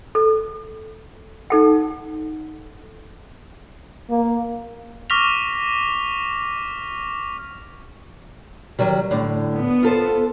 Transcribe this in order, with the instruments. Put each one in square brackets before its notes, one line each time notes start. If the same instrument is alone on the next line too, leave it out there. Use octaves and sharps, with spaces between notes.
[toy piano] A4
D#4 A4 F#5
[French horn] A#3
[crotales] C#6 D6 F6 A#6 B6 F7
[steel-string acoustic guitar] D#3 F#3 G3
A2 D3
[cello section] B3
[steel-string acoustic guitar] F4 A4 C5